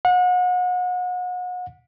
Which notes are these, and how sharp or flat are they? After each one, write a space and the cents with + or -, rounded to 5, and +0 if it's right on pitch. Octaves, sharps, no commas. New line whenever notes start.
F#5 -35